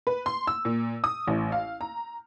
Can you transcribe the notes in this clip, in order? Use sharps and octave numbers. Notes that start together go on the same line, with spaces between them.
B4
C6
E6
A#2
D#6
A1
F5
A#5